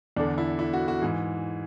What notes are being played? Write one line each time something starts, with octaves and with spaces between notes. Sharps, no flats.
E2 D3 D4
E4
E4
F#4
F#4
G#2 E3